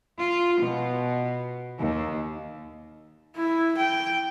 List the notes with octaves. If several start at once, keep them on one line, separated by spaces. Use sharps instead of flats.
F4
B2
D#2
E4
G5